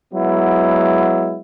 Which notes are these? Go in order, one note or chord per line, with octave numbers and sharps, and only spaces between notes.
F#3 G#3 B3 E4